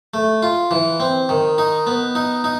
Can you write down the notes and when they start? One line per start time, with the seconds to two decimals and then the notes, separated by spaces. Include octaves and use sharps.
0.14 A3
0.43 F4
0.71 E3
1.00 C4
1.29 D#3
1.58 D#4
1.87 B3
2.15 D#4
2.44 D#4